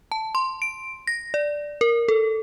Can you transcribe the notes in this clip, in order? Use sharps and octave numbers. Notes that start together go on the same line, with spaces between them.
A5
C6
D7
A#6
D5
A#4
A4